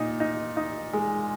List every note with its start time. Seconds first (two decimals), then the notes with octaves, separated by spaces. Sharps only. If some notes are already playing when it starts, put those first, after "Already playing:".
Already playing: A#2 D#4
0.20 D#4
0.57 D#4
0.93 G#3